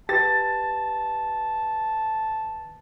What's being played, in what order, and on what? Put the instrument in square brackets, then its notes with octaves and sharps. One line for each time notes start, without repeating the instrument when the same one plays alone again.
[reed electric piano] G4 B4 [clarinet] A5 [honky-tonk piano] A6